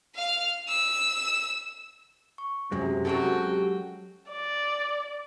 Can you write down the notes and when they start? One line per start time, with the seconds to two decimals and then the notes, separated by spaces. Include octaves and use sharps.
0.16 F5 F6
0.68 E6
2.38 C#6
2.72 F#2 C3 G#3 C#4
3.05 F#3 G#3 C#4 F#4 A4 F#5 G5
3.42 G4
4.31 D5